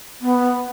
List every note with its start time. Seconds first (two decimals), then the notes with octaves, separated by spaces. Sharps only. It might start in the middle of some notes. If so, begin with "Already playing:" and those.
0.21 B3